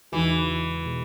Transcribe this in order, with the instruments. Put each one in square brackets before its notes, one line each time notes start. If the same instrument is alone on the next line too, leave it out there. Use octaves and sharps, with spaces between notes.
[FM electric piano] E2 C#3 G#3 D#4 F#4 [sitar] E3
[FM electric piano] B2 G#3